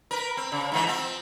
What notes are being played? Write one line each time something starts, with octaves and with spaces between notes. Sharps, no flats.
A#4 B4
C4
C#3
G#2 E3 A3
F3 C4